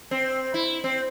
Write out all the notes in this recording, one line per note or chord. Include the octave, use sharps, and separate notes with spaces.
C4
E4
C4